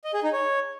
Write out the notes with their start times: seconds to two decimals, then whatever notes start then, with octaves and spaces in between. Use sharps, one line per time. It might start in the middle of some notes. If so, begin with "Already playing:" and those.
0.04 D#5
0.14 G#4
0.23 D#4
0.33 C#5